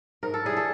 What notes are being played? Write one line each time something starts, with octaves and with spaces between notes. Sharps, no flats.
G#2 A#4
A4
E3 G3 G#4
A4